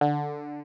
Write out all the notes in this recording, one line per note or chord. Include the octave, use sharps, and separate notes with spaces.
D3